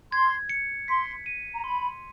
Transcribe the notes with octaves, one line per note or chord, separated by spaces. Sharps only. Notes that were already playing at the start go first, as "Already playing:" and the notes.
C6 G#6
C#7
C6 B6
D#7
A#5
B5 C6